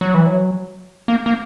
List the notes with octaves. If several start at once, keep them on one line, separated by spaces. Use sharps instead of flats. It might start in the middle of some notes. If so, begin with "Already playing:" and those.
F#3
E3
F#3
A#3
A#3